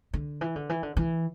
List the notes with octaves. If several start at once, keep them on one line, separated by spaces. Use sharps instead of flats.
D3
E3
D3
E3
D3
E3